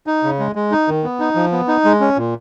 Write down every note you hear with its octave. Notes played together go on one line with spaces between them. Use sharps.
D#4
C#3
G#3
G#3
D#4
D#3
B3
D#4
F3
B3
D#4
G#3
C#4
A#2